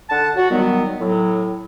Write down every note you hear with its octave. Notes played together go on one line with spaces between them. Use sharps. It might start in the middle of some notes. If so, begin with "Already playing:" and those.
D3 F#5 A5
F#4
D#3 F#3 G3 B3
A2 F#3